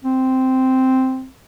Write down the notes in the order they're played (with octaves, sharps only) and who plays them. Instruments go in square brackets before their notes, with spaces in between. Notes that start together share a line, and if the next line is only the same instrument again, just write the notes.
[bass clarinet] C4